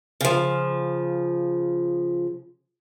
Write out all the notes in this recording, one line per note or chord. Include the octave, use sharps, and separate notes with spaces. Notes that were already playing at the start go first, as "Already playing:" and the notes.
C#3 F3